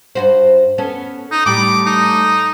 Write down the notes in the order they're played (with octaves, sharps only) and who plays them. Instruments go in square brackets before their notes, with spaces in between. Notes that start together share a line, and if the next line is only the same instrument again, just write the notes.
[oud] G2 F#4 C5
B3 C#4 A4
[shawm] D#4
[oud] A2 G3 [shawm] D6
[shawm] D#4